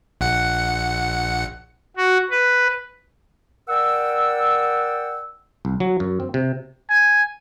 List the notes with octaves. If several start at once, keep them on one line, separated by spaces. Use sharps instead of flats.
A#1 F#5 C#7
F#4
B4
A#4 D5 F#5 G5 E6
C2
F#3
F#2
C4
C3
G#5